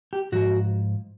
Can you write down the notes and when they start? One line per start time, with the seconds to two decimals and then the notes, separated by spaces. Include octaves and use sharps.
0.13 G4
0.32 G#2 F3 F#4